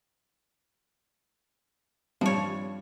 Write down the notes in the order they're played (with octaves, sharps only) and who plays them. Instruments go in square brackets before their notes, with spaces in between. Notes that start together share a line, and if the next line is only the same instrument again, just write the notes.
[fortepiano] G2 [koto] F3 C#5